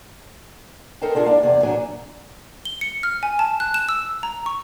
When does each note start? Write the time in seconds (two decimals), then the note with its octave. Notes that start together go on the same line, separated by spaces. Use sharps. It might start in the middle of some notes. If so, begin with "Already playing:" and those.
1.02 A4 A#4 C5 D#5 G5
1.15 D4 F4 G#4 A#4
1.26 A#3 D4 E4 D5
1.43 E2 C3 G#4 D5
1.63 A#2 F#3 D4 F#4 D5 G#5
2.65 G7
2.81 C#7
3.03 F6
3.23 G#5
3.39 A5
3.60 F#6
3.74 E7
3.89 E6
4.23 A#5
4.46 C#6